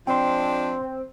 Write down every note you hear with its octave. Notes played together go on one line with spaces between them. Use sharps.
F3 G#3 C4 D4 C5 G5 C6